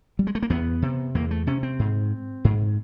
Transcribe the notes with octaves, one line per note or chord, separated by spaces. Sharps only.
G3
G#3
A3
A#3
E2 B3
C3
E2 A#3
A3
C3 C#4
C4
G#2
G#2